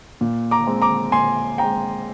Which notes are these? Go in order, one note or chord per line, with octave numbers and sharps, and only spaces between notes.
A#2
A#5 D6
G#3 C4
A#5 D6
A#2 G#5 C6
G#3 C4 G5 A#5